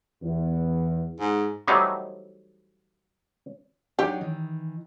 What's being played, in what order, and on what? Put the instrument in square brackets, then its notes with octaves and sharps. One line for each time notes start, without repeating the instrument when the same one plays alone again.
[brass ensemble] E2
[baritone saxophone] G#2
[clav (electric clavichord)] E3 F#3 G3 A3 C4 D#4
[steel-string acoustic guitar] F#3 D4 D#4 [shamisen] G4
[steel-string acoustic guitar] D#3 E3